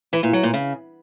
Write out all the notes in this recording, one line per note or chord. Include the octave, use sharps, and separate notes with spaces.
E3
A#2
F#3
A#2
C#3